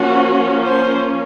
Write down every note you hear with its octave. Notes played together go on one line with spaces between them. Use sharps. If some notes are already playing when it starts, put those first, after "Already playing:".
Already playing: F3 A#3 C#4 F#4
C5